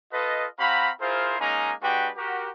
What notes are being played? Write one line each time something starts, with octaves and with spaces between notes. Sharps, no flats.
F4 A4 B4 D#5
C4 F#4 F5 A#5 B5
E4 F4 G#4 A#4 C5
G#3 A#3 C#4 D#4 G#5 A#5
G#3 D4 F#4 G4 B4 G5
F#4 G4 A#4